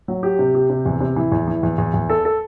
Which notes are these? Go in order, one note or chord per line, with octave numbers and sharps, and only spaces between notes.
F#3
G4
C3
G4
C3
E2
C3
E3
E2
E3
E2
E2
E2
A4
A4